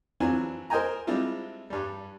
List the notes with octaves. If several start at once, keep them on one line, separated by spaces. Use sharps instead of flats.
E3 F#3 C4 D4 F4 G#5
A#4 C5 D#5 G5 G#5 A#5
G3 G#3 C4 D4 E4 F4
G2 G3